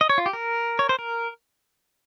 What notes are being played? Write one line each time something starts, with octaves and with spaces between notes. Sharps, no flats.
D#5
C#5
F4
G4
A#4
C#5
C5
A#4